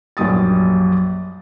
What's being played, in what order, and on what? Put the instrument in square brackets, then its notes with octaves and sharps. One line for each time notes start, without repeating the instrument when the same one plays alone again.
[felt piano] A#1 F#2 G3 D#6 A6